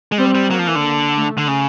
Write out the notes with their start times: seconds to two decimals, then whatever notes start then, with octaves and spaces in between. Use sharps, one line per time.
0.12 G#3
0.18 G3 C4
0.35 G3
0.50 F#3 A#3
0.59 F3
0.68 E3
0.76 D3
1.15 A3
1.38 D3
1.48 C#3